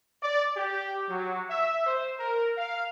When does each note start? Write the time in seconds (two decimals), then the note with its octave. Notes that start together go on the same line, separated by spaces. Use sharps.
0.23 D5
0.56 G4
1.09 F#3
1.50 E5
1.86 C5
2.19 A#4
2.58 F5